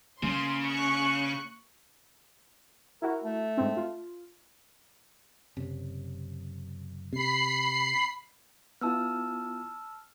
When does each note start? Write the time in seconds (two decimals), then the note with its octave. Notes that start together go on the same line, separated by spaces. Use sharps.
0.23 C#3 A#3 C6
0.66 C#6 F#6
3.02 E4 F#4 A#4
3.24 A3
3.57 G#2 C4
3.77 F4
5.57 F#1 C3
7.13 C3 B5 C7
8.81 B3 E4 F4 A5 E6 F6